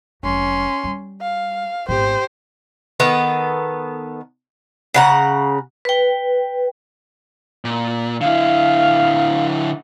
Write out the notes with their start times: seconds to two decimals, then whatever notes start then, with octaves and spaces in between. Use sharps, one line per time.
0.23 F1 F#3 C#4 C6
0.84 G3
1.22 F5
1.88 G#1 B3 G4 C5
3.00 D#3 B3 A4
4.94 C#3 F#5 A#5
5.85 B4 G5
7.65 A#2
8.21 D3 E4 F5